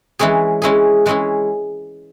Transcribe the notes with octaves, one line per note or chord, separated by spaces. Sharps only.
E3 G#3 C#4 E4 G#4
E3 G#3 C#4 E4 G#4
E3 G#3 C#4 E4 G#4